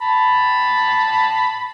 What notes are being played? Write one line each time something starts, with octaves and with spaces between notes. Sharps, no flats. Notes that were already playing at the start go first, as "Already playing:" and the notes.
A5 B5